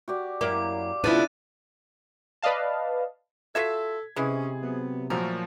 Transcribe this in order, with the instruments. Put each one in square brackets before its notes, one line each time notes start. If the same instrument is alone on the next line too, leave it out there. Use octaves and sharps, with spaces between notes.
[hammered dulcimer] F#4 G4 D5
[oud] F#2 A#3 E4 [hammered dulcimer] D5 F5 [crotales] D6
[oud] C#3 F3 B3 [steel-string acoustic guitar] D4 E4 [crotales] F#6 A6 D#7
[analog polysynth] B4 D5 D#5 F5 A5
[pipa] F4 F#4 E5 [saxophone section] A4 [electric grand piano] G#6 B6
[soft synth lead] C3 [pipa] E3 G#3 E4 [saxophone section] C#4 [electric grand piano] G#4
[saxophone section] F#3 B3
[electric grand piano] A#2 F3 F#3 [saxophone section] A3 F#4 [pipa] A#4